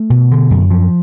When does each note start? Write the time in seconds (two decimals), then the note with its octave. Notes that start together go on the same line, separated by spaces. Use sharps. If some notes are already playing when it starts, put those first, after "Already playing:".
Already playing: A3
0.10 B2
0.31 D3
0.50 F#2
0.70 F3